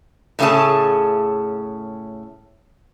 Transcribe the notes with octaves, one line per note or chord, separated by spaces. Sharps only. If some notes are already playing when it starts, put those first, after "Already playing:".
A2 C#3 A3 C#4 G#4 A5